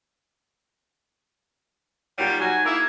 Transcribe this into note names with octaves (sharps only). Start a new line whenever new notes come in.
A#2 F#3 G3 D#4 G5
F#3 F#4 G#5
A#3 E4 G#4